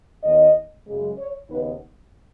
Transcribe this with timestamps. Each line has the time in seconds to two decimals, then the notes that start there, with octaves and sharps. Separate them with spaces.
0.23 D#2 D#3 B3 D#4 D#5
0.87 F#2 C#3 G#3
1.18 C#5
1.49 D#2 C#3 B3 D#4 B4